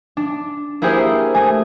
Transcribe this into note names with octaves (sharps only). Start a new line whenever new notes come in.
D4
A#3 E4 G4 G#4 C5
A3 G#4 G#5